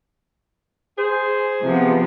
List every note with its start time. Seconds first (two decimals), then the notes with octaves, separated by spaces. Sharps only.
0.98 G#4 C5
1.62 C3 F3 B3